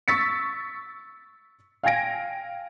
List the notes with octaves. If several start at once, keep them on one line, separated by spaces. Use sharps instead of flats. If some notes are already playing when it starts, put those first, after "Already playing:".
C#6 E6 A6 B6 C#7
F5 G5 G#5 G#6 A#6 D7